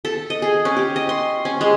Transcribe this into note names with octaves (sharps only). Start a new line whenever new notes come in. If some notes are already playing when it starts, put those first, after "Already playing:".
A4
D#5
G#4
C#4
G4
D#5
C6
C#4
G#3